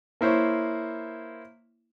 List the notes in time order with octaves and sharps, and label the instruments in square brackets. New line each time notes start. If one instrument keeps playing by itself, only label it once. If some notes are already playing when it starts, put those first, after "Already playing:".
[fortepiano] A#3 E4 C5 C#5